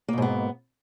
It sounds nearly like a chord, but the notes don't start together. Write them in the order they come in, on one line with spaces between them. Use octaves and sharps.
A#3 B2 G#2 B3